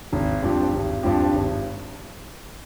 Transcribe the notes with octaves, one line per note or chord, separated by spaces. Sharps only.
G#1
G2 F3 C4 G4
G#1
G2 F3 C4 G4
G#1